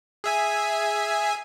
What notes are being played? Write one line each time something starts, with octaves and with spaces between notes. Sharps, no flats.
G#4 E5 G#5